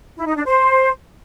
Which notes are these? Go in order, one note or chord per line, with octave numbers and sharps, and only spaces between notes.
E4
D#4
D4
C5